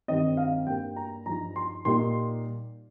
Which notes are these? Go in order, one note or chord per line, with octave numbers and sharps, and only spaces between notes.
G2 D#3 C4 D#5
F5
G2 G3 A#3 G5
A#5
G2 F3 D#4 A#5
C6
A#2 G3 A#3 D#4 C6